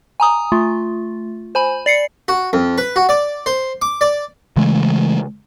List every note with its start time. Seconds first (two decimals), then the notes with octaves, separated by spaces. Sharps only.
0.20 G#5 A#5 D#6
0.52 A3 F4
1.55 C5 G#5 B5
1.86 D5 C7 C#7
2.28 F#4
2.53 F2
2.78 B4
2.96 F#4
3.09 D5
3.46 C5
3.82 D6
4.01 D5
4.57 C#3 E3 G#3 A3